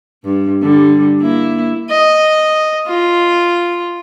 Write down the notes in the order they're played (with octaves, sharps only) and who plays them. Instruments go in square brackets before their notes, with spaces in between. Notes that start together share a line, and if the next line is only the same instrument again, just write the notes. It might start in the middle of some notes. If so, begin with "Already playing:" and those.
[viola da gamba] G2
D3 G3
A#3 E4
[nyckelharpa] D#5
F4